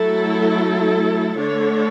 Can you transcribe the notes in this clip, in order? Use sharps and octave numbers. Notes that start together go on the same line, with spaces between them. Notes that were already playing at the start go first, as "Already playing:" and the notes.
Already playing: F#3 A3 E4 A4
D3 A3 D4 C#5